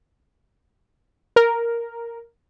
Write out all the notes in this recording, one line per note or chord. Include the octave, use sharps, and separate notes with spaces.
A#4